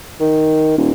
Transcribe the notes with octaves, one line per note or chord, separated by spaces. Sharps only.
D#3
D#1